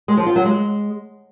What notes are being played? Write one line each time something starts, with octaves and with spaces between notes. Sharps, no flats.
G#3
F3
F4
F#3
G#3